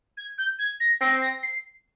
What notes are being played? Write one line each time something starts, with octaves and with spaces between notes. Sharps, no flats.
G#6
G6
G#6
A#6
C4 A#6
A#6
C7